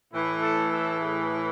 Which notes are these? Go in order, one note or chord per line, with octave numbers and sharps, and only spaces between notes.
A2 E3 E4
A4
A4
G#4